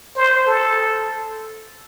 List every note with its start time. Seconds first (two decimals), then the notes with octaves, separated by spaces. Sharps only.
0.16 C5
0.46 A4